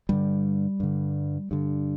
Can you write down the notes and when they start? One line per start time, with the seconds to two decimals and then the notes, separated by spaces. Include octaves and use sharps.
0.09 G2 D3 G3
0.80 G2 D3
1.51 G2 D3